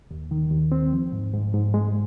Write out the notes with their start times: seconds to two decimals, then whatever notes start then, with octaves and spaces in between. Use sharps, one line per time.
0.11 D#2
0.31 D#3
0.51 D#2
0.72 C4
0.92 F3
1.12 G#2
1.34 G#2
1.54 G#2
1.74 G#3